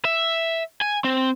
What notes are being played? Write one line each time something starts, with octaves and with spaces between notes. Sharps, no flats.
E5
G#5
C4